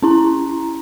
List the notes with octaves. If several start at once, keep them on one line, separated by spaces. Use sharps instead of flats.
C#4 E4 A#5